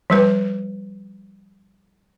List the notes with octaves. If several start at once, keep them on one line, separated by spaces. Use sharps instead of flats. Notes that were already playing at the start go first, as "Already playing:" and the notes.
F3 G3 B4